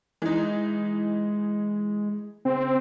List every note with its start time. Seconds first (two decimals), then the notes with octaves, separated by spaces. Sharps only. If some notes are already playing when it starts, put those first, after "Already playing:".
0.22 E3 G#3 D#4
2.45 C#3 C4